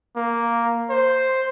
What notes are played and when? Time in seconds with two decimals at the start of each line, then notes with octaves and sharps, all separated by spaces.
0.17 A#3
0.90 C5